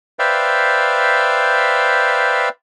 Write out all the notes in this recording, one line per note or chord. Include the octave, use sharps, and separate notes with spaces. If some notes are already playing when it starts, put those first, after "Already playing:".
B4 C5 D5 E5 F5 G5